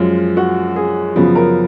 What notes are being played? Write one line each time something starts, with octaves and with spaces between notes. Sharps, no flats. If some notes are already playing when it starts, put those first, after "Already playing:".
Already playing: F#2 F3 G#3 F4
F#4
G#4
F#2 C#3 F3 B3
A#4